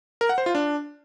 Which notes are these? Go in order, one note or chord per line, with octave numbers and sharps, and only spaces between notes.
A#4
F#5
C5
F4
D4